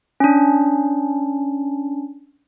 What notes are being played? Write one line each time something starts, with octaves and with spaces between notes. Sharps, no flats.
C#4 D4